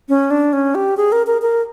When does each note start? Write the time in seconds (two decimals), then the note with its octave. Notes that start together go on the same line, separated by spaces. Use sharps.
0.09 C#4
0.31 D4
0.53 C#4
0.75 G4
0.97 G#4
1.12 A#4
1.27 A#4
1.42 A#4